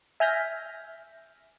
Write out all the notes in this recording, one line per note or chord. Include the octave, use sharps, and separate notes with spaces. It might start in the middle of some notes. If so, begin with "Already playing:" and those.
E5 G#5 F6 G6 A#6 B6